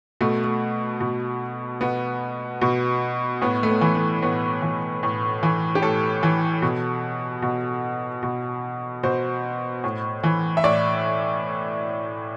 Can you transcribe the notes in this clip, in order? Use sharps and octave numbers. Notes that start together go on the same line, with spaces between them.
B2 A3
A3
B2
B2 B3
B2
A2 B3
A3
B3
E3
A3
A2 B3
E3
A2
E3
G4
A2 A4
E3
B2
B2
B2
B2 C5
A2
E3
E5
A2 D5